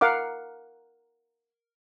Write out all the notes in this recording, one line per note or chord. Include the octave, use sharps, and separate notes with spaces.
A#4 F5 F#5 D6